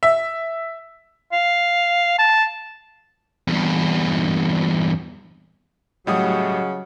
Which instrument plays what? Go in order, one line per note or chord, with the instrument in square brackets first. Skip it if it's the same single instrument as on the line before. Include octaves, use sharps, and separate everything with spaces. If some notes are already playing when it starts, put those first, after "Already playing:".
[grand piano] E5
[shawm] F5
A5
[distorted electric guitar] E2 G2
[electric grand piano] A2 G3 D#6 [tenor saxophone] C#3 [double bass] F#3 [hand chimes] D#5 F#5